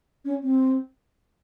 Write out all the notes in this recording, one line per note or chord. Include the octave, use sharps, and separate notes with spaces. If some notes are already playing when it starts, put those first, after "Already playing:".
C#4
C4